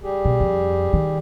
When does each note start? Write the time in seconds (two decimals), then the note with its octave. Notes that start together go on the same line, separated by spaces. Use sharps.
0.03 G3 G4 G#4
0.25 B2
0.40 F2
0.93 D#3